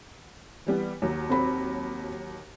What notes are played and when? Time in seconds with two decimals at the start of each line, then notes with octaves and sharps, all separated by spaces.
0.67 E3 G3 B3
1.02 D#2 F#3
1.30 C4 B5